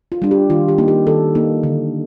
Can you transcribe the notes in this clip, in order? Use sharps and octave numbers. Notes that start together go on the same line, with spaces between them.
F4
G3 D4
G4
D#3 F4
G4
A#3 D#4
G4
D#3 A4
A#3 D#4
D3